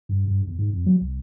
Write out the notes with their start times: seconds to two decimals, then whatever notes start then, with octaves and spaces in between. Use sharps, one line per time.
0.09 G2
0.27 G2
0.47 E2
0.59 G#2
0.73 F2
0.86 F#3
1.01 C2